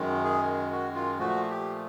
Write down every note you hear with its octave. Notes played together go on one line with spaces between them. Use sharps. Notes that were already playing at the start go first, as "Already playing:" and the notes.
Already playing: F#2 D#3 G#3
G#4
F#4
F4
A#2 F3 A3 F#4
G4